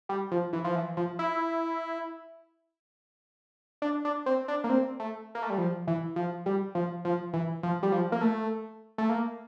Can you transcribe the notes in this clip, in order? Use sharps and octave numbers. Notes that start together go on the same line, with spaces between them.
G3
F3
E3
F3
E3
F3
E4
D4
D4
C4
D4
A#3
C4
A3
A#3
A3
G3
F3
E3
F3
G3
F3
F3
E3
F3
G3
F3
A#3
A3
A3
A#3